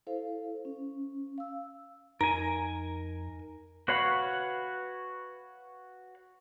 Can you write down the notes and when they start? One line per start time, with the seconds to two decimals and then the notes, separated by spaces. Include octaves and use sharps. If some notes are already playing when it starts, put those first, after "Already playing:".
0.07 E4 A4 C5 F5
0.65 C#4
1.38 F5 E6
2.21 F2 D#4 A#4 G#5 A#5
3.88 F#4 B4 C#5 F5 B5